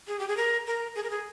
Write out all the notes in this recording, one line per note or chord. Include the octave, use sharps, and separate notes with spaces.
G#4
G4
G#4
A#4
A#4
G#4
A#4
G#4